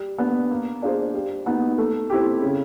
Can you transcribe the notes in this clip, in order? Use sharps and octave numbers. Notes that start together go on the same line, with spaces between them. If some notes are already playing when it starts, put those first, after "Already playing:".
Already playing: G3
B3 D4
A#3
D4 F4 G#4 C5
G3
B3 D#4 F#4
A3
C4 E4 G4
C#3